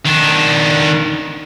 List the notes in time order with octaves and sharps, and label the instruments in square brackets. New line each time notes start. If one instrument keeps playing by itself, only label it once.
[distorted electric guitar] D#3 D4